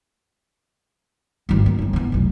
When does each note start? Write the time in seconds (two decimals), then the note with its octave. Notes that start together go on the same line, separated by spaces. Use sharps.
1.49 G#1 G2
1.66 A#3
1.78 G1 E4
1.93 E3 B3
2.12 F1 B1